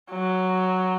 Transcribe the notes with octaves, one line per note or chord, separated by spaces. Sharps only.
F#3